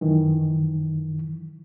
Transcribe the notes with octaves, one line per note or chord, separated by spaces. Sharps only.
F#2 D#3 E3